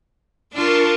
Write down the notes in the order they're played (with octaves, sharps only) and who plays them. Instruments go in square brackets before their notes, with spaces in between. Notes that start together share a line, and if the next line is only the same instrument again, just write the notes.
[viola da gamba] D4 F4 [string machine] A#4 A5 C#6